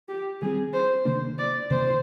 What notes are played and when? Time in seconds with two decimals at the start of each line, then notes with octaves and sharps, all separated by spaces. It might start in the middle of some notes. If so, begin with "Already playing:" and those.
0.09 G4
0.41 D#3 G3 C4 G#4
0.73 C5
1.05 C3 D#3 A#3 D4 C5
1.38 D5
1.70 C3 D#3 A#3 C5